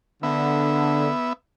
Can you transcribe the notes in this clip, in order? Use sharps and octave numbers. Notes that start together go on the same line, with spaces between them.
D3 B3 E5